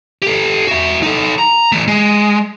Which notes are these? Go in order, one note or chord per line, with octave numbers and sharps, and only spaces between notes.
G4 A4
F#4 E5
D#4 A4
A#5
E3 A3
G#3